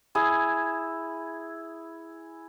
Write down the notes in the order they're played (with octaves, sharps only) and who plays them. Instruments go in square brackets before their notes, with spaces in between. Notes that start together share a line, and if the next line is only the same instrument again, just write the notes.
[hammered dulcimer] E4 G#4